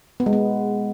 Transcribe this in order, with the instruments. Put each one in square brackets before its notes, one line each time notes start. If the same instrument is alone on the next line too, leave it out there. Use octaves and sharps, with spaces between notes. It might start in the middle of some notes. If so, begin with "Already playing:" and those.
[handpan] B3
G#3
B3